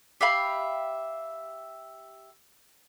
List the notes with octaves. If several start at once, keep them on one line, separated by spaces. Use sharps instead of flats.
G4 E5 F5 B5